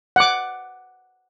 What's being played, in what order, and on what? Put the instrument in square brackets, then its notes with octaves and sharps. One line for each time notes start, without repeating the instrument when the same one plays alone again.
[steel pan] F#5 D6